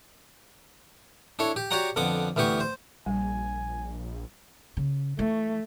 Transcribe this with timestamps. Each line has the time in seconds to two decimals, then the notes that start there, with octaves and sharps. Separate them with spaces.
1.39 D4 E4 A4 C#5
1.56 G4
1.71 F#4 G4 C#5 D5 F#5 A#5
1.96 F2 D3 B3 F#5 D6
2.36 D2 E3 B3 G4 C#6
2.60 C5
3.06 A#1 G3 G#5
4.77 C#3
5.19 E3 A3